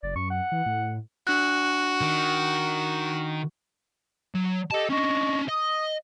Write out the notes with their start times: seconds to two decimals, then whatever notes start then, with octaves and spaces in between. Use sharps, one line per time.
0.03 F#1 D5
0.16 F#2 C#6
0.30 F#5
0.52 E3
0.66 A2
1.27 D4 F#4 F#6
2.01 D#3
4.35 F#3
4.71 G4 A4 D#5 A5
4.89 C#4 D4 D#5 C#6
5.48 D#5 D#6